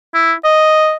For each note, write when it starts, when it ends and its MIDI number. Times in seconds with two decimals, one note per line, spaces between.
0.14 0.33 64
0.44 0.95 75